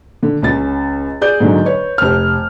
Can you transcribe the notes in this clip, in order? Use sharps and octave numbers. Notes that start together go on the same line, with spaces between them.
D3
C#2 C#4 A6
G#4 D5 G6
G#2 D3 F#3
B4 C#5
F1 F6